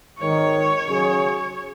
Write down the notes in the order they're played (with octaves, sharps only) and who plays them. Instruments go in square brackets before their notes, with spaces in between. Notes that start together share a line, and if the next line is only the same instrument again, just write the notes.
[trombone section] G#1 G#2 D#3 [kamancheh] C#5
[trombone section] C#3 F#3 C#4 G#4